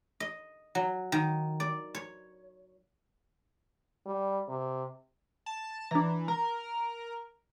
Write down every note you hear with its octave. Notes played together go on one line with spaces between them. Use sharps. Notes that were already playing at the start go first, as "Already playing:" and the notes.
D#5
F#3
D#3
D5
C#5
G3
C3
A5
E3 D4 A#5
A#4 A#5